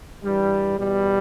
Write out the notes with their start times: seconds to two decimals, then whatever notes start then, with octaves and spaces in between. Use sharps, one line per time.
0.23 G2 E3 G3
0.77 E2 B2 G3